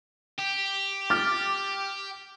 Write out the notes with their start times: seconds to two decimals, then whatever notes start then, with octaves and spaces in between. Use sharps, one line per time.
0.38 G4
1.10 D6 F6 A6